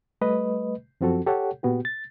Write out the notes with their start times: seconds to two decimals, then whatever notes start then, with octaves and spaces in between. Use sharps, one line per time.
0.21 G3 A3 B4 D#5
1.01 F#2 F3 C4 F#4 A4
1.26 G4 A4 C#5 F#5
1.63 A#2 B3 F#4 G4
1.85 A6